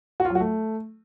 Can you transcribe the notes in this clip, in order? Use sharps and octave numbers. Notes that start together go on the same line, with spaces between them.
F#4
F4
F#3
F#4
A3